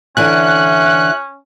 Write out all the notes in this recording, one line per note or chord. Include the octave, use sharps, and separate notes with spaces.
D3 E3 C#4 E5 G#5 F#6